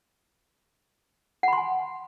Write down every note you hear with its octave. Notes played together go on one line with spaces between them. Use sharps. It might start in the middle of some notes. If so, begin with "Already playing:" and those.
F#5 G#5 B5 C6